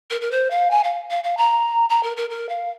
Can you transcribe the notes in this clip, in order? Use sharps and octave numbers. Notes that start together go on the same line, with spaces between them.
A#4
A#4
C5
F5
G#5
F5
F5
F5
A#5
A#5
A#4
A#4
A#4
F5